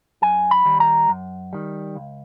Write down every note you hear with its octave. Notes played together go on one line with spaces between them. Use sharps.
F#2 G#5
B5
D#3 G3
A#5
F#2
D#3 G3
C#2